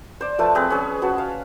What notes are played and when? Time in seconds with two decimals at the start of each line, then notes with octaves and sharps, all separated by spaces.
0.21 C5 D5
0.39 F3 A3 B4 A5
0.55 C4 G#4 B4
0.70 C#4 G#4
1.02 C#4 F#4 B4 A5
1.18 F5